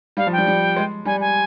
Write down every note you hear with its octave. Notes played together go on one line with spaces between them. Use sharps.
G3 F5
F3
G3 G5
G3
G#3
G3 G#5
G#5